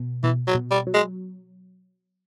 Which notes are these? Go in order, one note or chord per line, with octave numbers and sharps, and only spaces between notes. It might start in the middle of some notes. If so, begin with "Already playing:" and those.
Already playing: B2
B2 E3
F#3
B2
G3
F#3
G#3